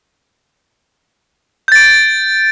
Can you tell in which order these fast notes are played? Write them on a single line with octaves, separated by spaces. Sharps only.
G6 A6 D7